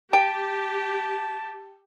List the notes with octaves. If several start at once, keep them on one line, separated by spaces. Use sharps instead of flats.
G4 G5 A5